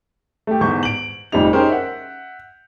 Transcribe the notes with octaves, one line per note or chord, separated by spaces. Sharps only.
A3 G4
E2 G#2 C#6 G6
D7 F#7
F1 F2 G3 C4 D#4 F7
C#4 D#4 G4 G#4 A#4 C5
E5 F#5